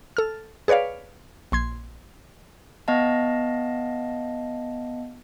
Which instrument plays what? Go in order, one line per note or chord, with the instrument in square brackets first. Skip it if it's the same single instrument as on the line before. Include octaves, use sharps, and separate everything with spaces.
[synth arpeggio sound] A4 F6
G#4 B4 C#5 D5 F5
A#1 C6 G#6
[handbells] B3 D#5 F5 A5